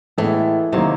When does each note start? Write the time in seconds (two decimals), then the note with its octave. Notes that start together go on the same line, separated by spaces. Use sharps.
0.18 A2 E3 G#3 B3
0.73 C3 D#3 F#3 A#3